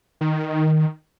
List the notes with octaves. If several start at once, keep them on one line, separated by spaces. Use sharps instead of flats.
D#3